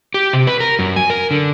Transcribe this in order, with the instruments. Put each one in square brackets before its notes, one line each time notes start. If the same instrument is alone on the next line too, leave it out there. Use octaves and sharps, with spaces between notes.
[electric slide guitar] G4
C3
B4
A#4
F#2
G#5
A#4
D3